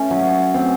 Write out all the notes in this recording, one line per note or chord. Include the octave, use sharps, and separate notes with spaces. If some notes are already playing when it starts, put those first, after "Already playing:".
Already playing: A3 C#4
F#3
C4